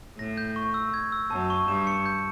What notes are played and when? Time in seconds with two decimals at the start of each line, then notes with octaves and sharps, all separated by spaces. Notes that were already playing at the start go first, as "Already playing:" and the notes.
0.18 A2 A#6
0.37 G6
0.56 C#6
0.74 E6
0.94 G#6
1.12 E6
1.31 F#2 A5
1.50 C#6
1.68 G2 E7
1.87 C#7
2.05 G6